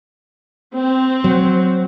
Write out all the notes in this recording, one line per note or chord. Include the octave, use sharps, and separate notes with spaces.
C4
F#3